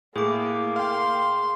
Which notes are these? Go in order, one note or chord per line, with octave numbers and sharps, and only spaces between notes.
A2 A#3 G#4 D6
F5 G5 C6